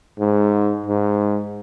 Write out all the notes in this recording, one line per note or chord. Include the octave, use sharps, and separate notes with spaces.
G#2
G#2